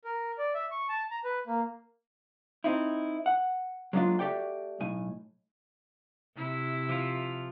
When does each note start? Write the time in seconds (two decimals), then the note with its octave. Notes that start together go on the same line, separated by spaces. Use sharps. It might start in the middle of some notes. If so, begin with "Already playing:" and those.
0.05 A#4
0.38 D5
0.54 E5
0.71 C#6
0.89 A5
1.11 A#5
1.24 B4
1.47 A#3
2.64 C4 D#4 E4
3.26 F#5
3.93 F#3 G#3 A#3 C#4 D4 F4
4.19 A3 F#4 G4 A4 D5 G5
4.80 B1 A2 G#5
6.36 C3 E4
6.89 F3 F4